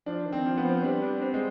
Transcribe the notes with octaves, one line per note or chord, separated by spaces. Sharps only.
F3 D4
D#3
C4
F3
B3
F3
G3 D4
D4
C4
G#3